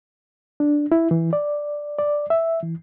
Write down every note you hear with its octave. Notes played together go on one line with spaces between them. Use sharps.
D4
E4
E3
D5
D5
E5
E3